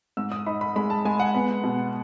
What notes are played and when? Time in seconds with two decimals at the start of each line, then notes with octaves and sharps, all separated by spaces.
0.17 G#2 E6
0.32 D#6
0.46 D#4 B5
0.61 B5
0.76 G#3 B5
0.90 A5
1.05 G#3 G#5
1.20 F#5
1.35 B3
1.64 B2